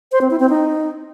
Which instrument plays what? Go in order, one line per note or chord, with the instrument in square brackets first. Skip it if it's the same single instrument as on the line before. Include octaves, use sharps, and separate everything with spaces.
[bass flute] C5
C4
E4
C4
D#4